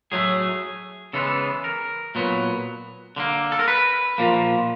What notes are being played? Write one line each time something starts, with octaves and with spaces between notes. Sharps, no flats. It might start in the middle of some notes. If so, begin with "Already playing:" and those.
A2 F#3 A3 G#4
C#3 E3 G#3 B3 A4
A#4
A#2 F#3 B3
D3 G3 A#3
A4
A#4
B4
A#2 F3 A#3